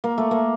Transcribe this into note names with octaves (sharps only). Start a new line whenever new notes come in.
A#3
A3
A#3